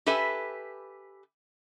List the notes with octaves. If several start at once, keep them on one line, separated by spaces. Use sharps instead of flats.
G4 A4 B4 E5 G#5